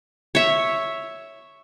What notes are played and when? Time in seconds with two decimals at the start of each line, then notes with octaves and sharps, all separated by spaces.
0.35 C#5 E5